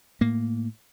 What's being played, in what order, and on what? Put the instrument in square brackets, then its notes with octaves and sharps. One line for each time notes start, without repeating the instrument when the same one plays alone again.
[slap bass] A2 A#3